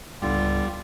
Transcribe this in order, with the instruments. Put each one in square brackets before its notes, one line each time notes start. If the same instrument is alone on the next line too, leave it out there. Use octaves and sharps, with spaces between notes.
[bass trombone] G1 [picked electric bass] C#2 G#2 [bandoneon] D3 F4 [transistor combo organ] G3